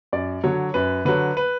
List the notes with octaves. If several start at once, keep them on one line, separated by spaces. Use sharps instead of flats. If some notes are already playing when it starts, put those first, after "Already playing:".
F#2 D5
D3 F#3 C#5
F#2 B4
D3 F#3 B4
B4